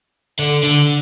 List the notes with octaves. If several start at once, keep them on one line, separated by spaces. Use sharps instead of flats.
D3
D3